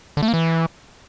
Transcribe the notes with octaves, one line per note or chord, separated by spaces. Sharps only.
D3
A3
A#3
E3